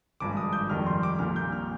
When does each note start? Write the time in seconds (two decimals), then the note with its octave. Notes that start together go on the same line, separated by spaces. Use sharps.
0.20 G#1 G2 F3 G#3 D6
0.37 D#6
0.53 G6
0.69 F1 F2 D#3 G3 F6
0.86 C6
1.03 D6
1.19 A#1 A#2 G3 F6
1.36 G6
1.52 F6